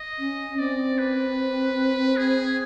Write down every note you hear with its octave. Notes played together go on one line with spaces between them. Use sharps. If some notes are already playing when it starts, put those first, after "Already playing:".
Already playing: D#5
C#4
C4 D5
B4
G#4